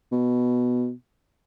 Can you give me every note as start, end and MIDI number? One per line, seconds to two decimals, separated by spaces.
0.12 0.92 47